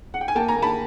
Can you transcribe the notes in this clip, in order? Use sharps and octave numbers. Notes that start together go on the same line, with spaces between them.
F#5
G5
G#5
A#3 G5 A5
G#5 A#5
A#3
A5 B5